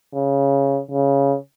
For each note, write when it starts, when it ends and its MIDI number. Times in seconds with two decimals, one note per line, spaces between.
0.14 0.80 49
0.91 1.36 49